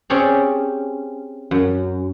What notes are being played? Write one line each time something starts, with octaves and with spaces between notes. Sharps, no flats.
C4 C#4 G4 G#4 C#5 D5
F#2